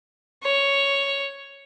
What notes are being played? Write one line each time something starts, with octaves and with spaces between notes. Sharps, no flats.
C#5